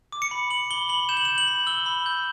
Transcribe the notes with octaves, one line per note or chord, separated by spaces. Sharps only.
D6
C#7
B5
D6 F#7
B5 G7
B5 F#7
G6 E7
F#7
G6 E7
F#7
B5
E6 G7
B5
G6